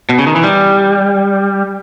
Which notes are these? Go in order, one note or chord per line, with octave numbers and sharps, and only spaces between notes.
B2
C#3
D#3
E3
G3